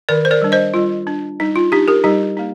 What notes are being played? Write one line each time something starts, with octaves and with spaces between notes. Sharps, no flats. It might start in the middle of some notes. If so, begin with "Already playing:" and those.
D#3 A#4 D5
C5
A#4 D5
G3 D4
C5 D#5
G3 F4
D4
G3 D#4
F4
D4 D#4 G4
G4 A#4
G3 D#4 G4
A#3 D#4